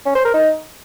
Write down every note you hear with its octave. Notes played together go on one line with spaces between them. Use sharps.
C#4
C5
A#4
D#4